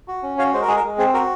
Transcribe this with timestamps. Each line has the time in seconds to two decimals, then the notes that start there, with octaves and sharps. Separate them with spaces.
0.08 F#4
0.23 C#4
0.38 F#4 C#5 F5
0.53 G#3 C5
0.62 A#4
0.68 G#3 G#4
0.76 A#4
0.83 G#3
0.98 C4 G#4
1.14 F#4 A#4